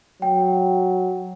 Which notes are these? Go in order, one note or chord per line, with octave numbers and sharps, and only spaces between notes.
F#3 G5